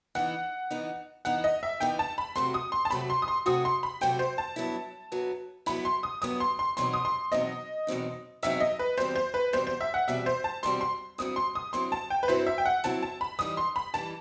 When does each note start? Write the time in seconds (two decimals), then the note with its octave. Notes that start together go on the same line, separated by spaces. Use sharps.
0.15 E3 B3 D#4 F#5
0.70 E3 B3 D#4
1.25 E3 B3 D#4 F#5
1.44 D#5
1.63 E5
1.80 E3 B3 D#4 G5
1.99 A5
2.18 B5
2.35 C3 F#3 A3 C4 F#4 C6
2.54 D#6
2.72 C6
2.85 A5
2.91 C3 F#3 A3 C4 F#4 B5
3.10 C6
3.22 D#6
3.28 C6
3.46 C3 F#3 A3 C4 F#4 D#6
3.65 C6
3.83 B5
4.01 C3 F#3 A3 C4 F#4 G5
4.19 C5
4.38 A5
4.56 G2 F#3 B3 E4
5.12 G2 F#3 B3 E4
5.66 G2 F#3 B3 E4 B5
5.85 C6
6.03 D#6
6.22 G2 F#3 B3 E4 D#6
6.40 C6
6.59 C6
6.77 E2 B2 F#3 C4 D#4 C6
6.93 D#6
7.05 C6
7.32 E2 B2 F#3 C4 D#4 D#5
7.87 E2 B2 F#3 C4 D#4
8.43 E2 B2 F#3 C4 D#4 E5
8.60 D#5
8.79 B4
8.97 E2 B2 G3 C4 C5
9.16 C5
9.34 B4
9.53 E2 B2 G3 C4 C5
9.67 C5
9.81 E5
9.94 F#5
10.08 E2 B2 G3 C4 E5
10.26 C5
10.44 A5
10.63 E2 B2 G3 C4 C6
10.81 C6
11.18 G2 F#3 C4 E4 D#6
11.36 C6
11.55 D#6
11.73 G2 F#3 C4 E4 C6
11.92 A5
12.10 G5
12.23 B4
12.28 G2 F#3 C4 E4 C5
12.46 E5
12.58 G5
12.66 F#5
12.84 G2 F#3 C4 E4 A5
13.02 A5
13.21 B5
13.39 E3 G3 D#4 D#6
13.57 C6
13.76 B5
13.94 E3 G3 D#4 A5